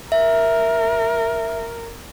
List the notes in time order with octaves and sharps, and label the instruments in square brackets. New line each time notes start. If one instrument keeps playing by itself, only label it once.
[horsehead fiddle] A#4 [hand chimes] E5